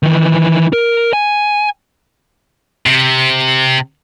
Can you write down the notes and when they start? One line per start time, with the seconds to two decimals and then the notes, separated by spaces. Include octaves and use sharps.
0.03 D#3 E3
0.73 A#4
1.13 G#5
2.86 C3